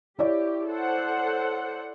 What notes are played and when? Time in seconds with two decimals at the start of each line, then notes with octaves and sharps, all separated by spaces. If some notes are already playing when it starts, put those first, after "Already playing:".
0.19 E4 G4 C#5 D5
0.68 A4 C5 F#5